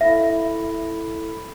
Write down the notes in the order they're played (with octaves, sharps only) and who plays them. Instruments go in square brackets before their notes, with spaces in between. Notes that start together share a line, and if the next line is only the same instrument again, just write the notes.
[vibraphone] E4 A4 B5 [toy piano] E5